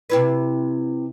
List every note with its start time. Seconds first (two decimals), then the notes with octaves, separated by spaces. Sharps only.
0.10 C3 E4 B4